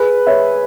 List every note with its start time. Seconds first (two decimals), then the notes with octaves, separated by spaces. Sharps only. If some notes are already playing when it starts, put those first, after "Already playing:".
Already playing: G#4 B4
0.27 C#5 E5